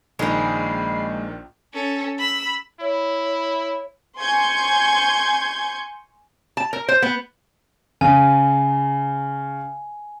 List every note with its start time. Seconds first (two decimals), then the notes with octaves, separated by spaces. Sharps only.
0.19 A#1 D#3 G#3 A#3 B5 C7
1.74 C#4 A4
2.18 B5 E6
2.80 E4 C#5
4.20 G#5 C6 C#6 G6 G#6
6.57 A5
6.73 A#4
6.88 C5
7.02 B3
8.01 C#3 G#5